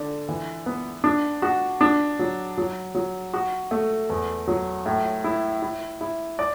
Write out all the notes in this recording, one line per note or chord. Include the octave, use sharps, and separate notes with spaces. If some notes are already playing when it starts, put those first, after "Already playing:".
Already playing: D3 D5
E3
B3
D4
F#4
D4
F#3
F#3
F#3
F#4
A3
E2
F#3
A2
E4
E4
E4
D5